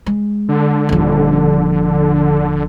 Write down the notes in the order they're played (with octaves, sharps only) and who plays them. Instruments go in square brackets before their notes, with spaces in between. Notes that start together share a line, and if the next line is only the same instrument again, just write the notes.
[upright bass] G#3
[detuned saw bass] D3
[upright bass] D#1 F3